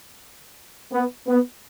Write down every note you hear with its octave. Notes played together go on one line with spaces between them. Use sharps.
B3
B3